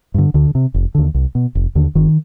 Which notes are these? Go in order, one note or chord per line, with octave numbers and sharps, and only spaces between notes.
G2 D3
D2 D3
C3
F1
D#2 D3
C2
B2
F1
D#2 D3
G1 D#3